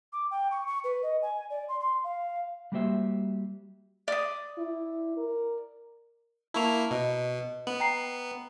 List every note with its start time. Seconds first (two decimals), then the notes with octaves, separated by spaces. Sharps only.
0.12 D6
0.31 G5
0.51 C#6
0.67 C#6
0.84 B4
1.03 D#5
1.22 G#5
1.50 D5
1.68 C6
1.80 C6
2.04 F5
2.72 G3 A#3 F#4 G4 C5 E5
4.08 D5 D#6
4.58 E4
5.18 A#4
6.54 A#3 E4 A5 C#6 F7
6.91 B2 D#5
7.67 B3 F#7
7.80 G5 A#5 C7